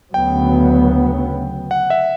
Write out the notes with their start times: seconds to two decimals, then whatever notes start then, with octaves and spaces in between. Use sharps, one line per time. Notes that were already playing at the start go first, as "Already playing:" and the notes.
0.14 D2 C#3 F#3 B3 G5
1.71 F#5
1.90 E5